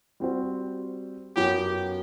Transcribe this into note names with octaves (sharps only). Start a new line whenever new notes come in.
G3 C4 F#4 C5
F#2 F#3 B3 F#4 G4